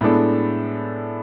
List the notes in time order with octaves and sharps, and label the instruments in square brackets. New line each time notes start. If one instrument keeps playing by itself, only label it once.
[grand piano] A2 G#3 B3 D4 A4